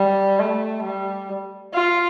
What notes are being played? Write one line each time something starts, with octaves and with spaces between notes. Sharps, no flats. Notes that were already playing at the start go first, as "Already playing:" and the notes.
Already playing: G3
A3
G3
F4